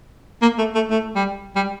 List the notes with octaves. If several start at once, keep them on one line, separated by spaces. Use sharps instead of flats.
A#3
A3
A3
A3
G3
G3